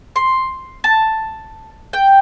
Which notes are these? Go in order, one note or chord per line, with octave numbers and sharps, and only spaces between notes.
C6
A5
G5